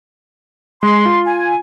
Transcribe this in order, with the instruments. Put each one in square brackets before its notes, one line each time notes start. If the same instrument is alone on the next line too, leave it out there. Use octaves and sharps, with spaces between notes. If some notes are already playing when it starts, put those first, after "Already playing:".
[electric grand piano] G#3 [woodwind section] C6
[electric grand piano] F4
[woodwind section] G#5